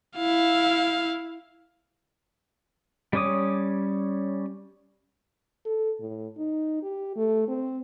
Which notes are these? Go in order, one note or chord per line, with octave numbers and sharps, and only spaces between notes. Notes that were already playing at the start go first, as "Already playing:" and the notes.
E4 F5
G3 C#4 C#5 D6 D#6
A4
A2
D#4
G4
A3
C4